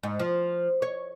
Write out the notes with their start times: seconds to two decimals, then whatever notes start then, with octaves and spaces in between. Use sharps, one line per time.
0.03 G#2
0.20 F3
0.82 C#5